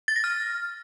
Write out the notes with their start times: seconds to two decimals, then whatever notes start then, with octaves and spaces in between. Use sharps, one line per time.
0.08 A6
0.16 A#6
0.24 F6